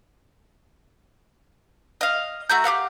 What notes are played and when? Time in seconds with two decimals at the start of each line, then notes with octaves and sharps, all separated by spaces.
2.01 D#5 F5
2.49 A3 F#4 A#5 G6
2.64 G4 A4 F5 F#5